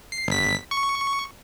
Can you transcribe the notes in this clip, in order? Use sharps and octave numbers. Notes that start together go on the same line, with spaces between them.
C7
G1 B6
C#6